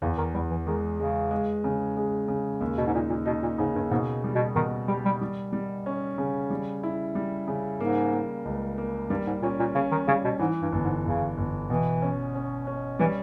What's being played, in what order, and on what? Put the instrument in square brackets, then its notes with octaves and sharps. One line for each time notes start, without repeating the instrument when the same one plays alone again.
[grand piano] E2 [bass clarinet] C#3
[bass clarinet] D#3
[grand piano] E2 [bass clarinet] G3
[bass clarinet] E3
[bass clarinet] D#3 [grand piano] G#3
[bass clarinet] C#3 [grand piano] G#3
[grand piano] G#3
C#3
G#3
C#3
D#2
[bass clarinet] B2
G#2
[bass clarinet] A#2 [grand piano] D#4
[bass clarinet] A#2
[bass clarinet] B2 [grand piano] D#4
[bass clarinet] A#2
[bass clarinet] G#2 [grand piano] C#3
[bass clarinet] G2
[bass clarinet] G#2 [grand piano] B2
[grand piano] G3
[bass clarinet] B2
[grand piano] B2 [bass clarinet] D#3
[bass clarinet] G3 [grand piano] G4
[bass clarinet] G3
[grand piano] G3
G3
C#4
C#3
G3
E4
G3
C#3
[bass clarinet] G#2 [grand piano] A#3
[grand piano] A#3
C#2
A#3
[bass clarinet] G2 [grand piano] G3
[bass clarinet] G#2
[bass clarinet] A#2 [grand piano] C#4
[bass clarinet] A#2
[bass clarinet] C#3 [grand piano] C#4
[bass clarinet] D#3
[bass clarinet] C#3 [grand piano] G3
[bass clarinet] B2
[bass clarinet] G#2 [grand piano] E3
[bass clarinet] G2
[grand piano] G1
[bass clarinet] G#2
[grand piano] G1 [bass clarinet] C#3
[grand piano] G1
[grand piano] B2 [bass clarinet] E3
[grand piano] C#4
C#4
C#4
[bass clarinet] E3 [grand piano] G3